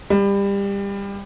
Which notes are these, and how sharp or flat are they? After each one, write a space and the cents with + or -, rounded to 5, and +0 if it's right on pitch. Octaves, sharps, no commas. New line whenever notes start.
G3 +25